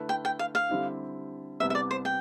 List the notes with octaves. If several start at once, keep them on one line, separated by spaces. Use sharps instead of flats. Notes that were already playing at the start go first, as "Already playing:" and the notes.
Already playing: D3 A3 E4 B4
G5
G5
F5
F5
D3 G3 C4 E4 G4
C2 C3 G3 B3 E5
E5
D5
C5
G5